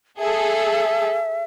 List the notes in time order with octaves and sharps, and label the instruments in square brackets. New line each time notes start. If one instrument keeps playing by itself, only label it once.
[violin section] G#4 A4 [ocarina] E5